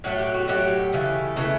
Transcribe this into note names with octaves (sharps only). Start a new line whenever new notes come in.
A2 F#3 A3 F#4
G4
F#4
A2 F#3 A3 G4
C#3 E3 A3
C#3 E3 A3 A4